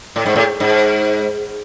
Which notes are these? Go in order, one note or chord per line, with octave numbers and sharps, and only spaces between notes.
A2
G#2
A2
G#2